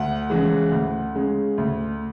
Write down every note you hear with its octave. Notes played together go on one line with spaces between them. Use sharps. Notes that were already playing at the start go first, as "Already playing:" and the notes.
Already playing: D2 F#5
C#3 E3 G#3
D2
C#3 G#3
D2